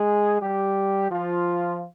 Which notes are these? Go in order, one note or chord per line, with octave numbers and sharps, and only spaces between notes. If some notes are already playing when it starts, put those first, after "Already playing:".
Already playing: G#3 G#4
G3 G4
F3 F4